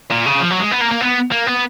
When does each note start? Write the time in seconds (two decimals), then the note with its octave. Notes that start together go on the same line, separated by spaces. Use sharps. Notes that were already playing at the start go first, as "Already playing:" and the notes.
0.11 A#2
0.26 C#3
0.41 F3
0.51 F#3
0.61 G#3
0.72 B3
0.82 A#3
0.92 A#3
1.02 B3
1.32 A#3
1.47 B3